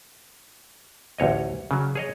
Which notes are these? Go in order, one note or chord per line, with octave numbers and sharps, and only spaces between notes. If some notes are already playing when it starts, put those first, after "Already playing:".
A1 D2 C#5 D#5
C#3 F#3
G#4 C#5 D#5